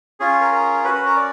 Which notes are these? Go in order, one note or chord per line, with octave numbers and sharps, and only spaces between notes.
C#4 F4 G#4
A#4
A#4
C#4 F#4 B4
B4
A#4
D5